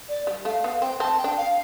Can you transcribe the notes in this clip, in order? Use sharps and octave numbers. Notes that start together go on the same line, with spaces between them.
D5
G3
A3 F5
B3 F5
C4 G5
C4 A5
G5
D4
F5